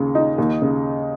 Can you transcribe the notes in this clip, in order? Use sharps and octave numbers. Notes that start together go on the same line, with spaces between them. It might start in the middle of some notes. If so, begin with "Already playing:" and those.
Already playing: D#2 C#3
D#4
D#2
C#3